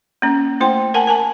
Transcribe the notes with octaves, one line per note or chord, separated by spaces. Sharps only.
A#3 C#4
A3 E4 C5 G5
A#4 F#5 G#5 A5
A#4 G#5 A5